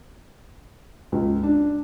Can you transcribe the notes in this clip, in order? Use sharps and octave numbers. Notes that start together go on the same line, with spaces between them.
C#2
D4